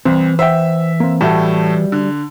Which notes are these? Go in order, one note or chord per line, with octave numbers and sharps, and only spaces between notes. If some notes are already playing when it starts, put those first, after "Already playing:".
C2 E3 C4
C5 E5 F#5 G5
A#3 C4
A2 G3 A3 F#4 E5
D3